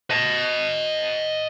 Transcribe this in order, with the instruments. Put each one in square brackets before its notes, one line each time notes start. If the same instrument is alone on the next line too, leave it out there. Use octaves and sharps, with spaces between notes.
[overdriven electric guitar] D#5 A5